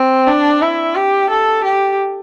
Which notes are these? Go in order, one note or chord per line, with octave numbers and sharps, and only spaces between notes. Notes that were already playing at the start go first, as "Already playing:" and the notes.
Already playing: C4
D4
E4
G4
A4
G4